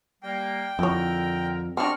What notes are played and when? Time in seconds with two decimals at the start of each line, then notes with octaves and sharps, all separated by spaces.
0.23 G3 A#3 G5
0.79 F2 D3 E4 A#4 C#5
1.77 C4 D4 F#4 A#4 C#6 F6